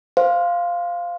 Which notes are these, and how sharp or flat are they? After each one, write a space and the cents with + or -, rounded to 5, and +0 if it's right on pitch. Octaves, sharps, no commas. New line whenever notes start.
C5 +0 F5 +0